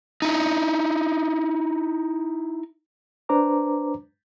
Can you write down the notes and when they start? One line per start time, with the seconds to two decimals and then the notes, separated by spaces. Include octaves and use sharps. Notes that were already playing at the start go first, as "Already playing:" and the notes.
0.22 D#4 E4
3.29 D4 B4 C5 A#5 D6